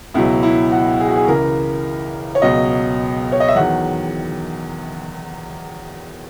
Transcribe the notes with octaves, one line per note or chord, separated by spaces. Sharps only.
C#2 B2 F#3 E4
E4
F#4
G#4
F#4
G#4
C#2 C#3 E3 A#4
C#5
C#2 B2 F#3 D#5
C#5
D#5
E5
E2 D#3 F#3 F#5